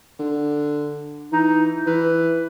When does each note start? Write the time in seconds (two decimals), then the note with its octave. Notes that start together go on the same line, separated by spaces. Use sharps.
0.19 D3
1.32 E3 D#4
1.87 E3 B4